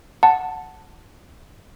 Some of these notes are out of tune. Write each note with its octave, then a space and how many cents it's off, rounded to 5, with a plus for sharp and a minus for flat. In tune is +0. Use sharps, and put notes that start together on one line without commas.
F#5 +0 A5 +0